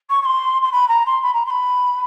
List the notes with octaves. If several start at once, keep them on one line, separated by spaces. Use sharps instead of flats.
C#6
C#6
C6
C6
B5
A#5
C6
B5
A#5
C6
B5